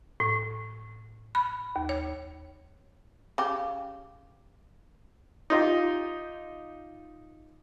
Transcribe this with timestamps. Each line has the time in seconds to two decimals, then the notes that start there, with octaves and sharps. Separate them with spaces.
0.20 A2
1.35 B5
1.76 D#2
1.89 C#5
3.38 C#3 G4
5.50 D#4 F4 G4